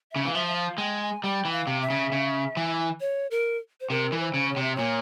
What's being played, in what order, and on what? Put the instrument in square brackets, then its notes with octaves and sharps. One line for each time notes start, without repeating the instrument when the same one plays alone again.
[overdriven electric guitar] C#3 [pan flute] E5
[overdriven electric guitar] E3 [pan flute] F5
[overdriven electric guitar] F3 [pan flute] E5
[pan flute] E5
F5
[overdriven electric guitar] G#3 [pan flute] G5
[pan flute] G#5
[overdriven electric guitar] G3 [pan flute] G5
[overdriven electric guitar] E3
[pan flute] F5
[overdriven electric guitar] C3
[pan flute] E5
[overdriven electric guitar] C#3
C#3
E3
[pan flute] C#5
A#4
C5
[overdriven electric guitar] C3 [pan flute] A#4
[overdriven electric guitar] E3
[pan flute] C5
[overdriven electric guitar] C#3
[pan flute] C#5
[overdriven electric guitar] C3
[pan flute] E5
[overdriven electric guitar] A#2 [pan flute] C#5